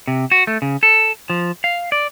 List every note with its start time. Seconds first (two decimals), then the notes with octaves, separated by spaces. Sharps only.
0.07 C3
0.31 F#4
0.47 A3
0.62 C#3
0.83 A4
1.30 F3
1.64 F5
1.92 D5